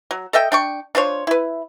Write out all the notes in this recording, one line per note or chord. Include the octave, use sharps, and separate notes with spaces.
F#3
A4 D#5 E5 G5
D4 G5 C#6
D4 F4 C5 C#5
E4 B4